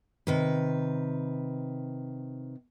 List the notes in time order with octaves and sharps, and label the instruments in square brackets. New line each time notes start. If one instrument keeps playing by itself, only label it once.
[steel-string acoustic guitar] C3 D#3 B4